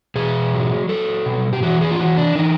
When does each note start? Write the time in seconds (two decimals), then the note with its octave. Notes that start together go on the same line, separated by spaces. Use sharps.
0.15 B2 G#4
0.53 F#3
0.89 F#3 A4
1.26 B2
1.53 G4
1.63 E3 F#4
1.81 G#4
1.91 F4
1.99 E3 F#4
2.17 D4
2.35 E3 D#4